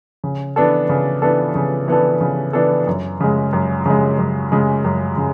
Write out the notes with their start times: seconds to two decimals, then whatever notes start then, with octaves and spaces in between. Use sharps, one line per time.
0.24 C#3
0.56 E3 B3 D4 A4
0.89 C#3
1.22 E3 B3 D4 A4
1.55 C#3
1.88 E3 B3 D4 A4
2.21 C#3
2.53 E3 B3 D4 A4
2.87 F#2
3.20 C#3 G#3
3.53 F#2
3.86 C#3 G#3
4.18 F#2
4.52 C#3 G#3
4.85 F#2
5.18 C#3